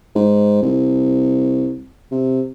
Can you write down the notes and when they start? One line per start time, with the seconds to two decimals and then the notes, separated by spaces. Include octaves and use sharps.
0.16 G#2
0.62 C2
2.11 C3